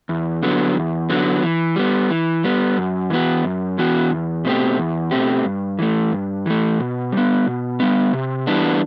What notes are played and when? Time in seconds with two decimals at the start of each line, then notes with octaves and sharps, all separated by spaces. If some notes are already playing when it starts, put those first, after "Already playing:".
0.09 E2
0.43 D3 F#3 B3
0.76 E2
1.10 D3 F#3 B3
1.43 E3
1.76 G3 B3
2.10 E3
2.44 G3 B3
2.77 F#2
3.10 E3 B3 F#4
3.44 F#2
3.78 E3 B3 F#4
4.11 E2
4.45 B2 A3 C4 G4
4.79 E2
5.11 B2 A3 C4 G4
5.45 G2
5.79 E3 A3
6.12 G2
6.46 E3 A3
6.79 B2
7.12 G3 B3
7.47 B2
7.80 G3 B3
8.13 C3
8.47 E3 G3 B3 D4